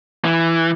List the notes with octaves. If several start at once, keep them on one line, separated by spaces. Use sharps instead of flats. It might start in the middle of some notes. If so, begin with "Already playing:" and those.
E3